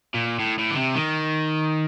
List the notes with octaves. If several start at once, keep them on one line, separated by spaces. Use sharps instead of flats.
A#2
A2
A2
D3
C3
D#3